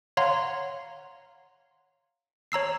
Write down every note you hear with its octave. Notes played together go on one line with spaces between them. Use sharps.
C#5 F5 F#5 A#5 C6
C#5 A#5 E6 C7